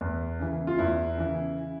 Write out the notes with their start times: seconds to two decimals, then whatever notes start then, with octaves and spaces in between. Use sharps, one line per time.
0.01 E2
0.39 C#3 E3
0.67 F4
0.79 E2 E4
1.17 C#3 E3